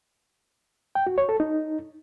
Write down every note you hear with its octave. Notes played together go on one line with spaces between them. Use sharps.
G5
F#4
C#5
A4
D#4